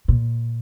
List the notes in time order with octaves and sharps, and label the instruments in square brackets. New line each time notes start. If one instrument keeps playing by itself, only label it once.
[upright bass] A#2